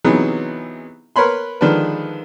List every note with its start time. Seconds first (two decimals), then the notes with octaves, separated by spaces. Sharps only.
0.05 C3 E3 F#3 B3 D#4 G#4
1.16 A#4 B4 C#5 B5 C6
1.61 D3 D#3 F3 G#3 D4 B4